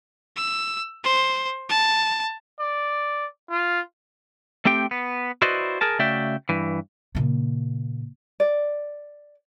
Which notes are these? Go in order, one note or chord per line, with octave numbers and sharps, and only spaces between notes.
E6
C5
A5
D5
F4
A3 C4 G4 G5
B3
E4 F#4 B4 C5 D5 D#5
G#4 A#4 A5
C#3 A3 F#4 D5 E5 G5
G2 E3
A#2 C#3
D5